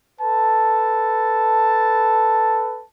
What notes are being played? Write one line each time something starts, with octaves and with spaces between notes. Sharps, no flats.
A4 B4 A5